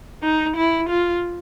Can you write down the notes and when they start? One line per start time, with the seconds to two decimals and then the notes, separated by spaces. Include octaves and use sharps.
0.23 D#4
0.56 E4
0.89 F4